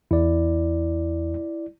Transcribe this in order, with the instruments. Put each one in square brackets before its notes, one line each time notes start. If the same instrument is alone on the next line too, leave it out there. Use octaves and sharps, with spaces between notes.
[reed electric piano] E2 [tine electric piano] E4 D5